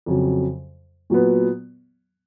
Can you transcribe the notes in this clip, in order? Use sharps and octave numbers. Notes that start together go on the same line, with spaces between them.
F2 C#3 F#3
A#2 F#3 B3